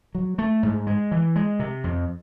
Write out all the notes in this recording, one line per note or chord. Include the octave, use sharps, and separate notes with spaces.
F#3
A3
G#2
G#3
E3
G#3
C3
F2